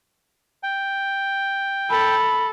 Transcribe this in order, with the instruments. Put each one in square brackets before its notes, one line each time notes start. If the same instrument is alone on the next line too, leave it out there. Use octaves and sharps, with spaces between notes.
[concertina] G5
[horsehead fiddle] A4 [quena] B5